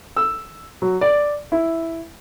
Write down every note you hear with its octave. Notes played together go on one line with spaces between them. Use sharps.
E6
F#3
D5
E4